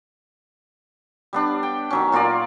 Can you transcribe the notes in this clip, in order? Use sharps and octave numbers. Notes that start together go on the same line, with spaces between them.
G3 B3 D4
G5
D#3 F#3 C#4
A#2 F4 A#4 D5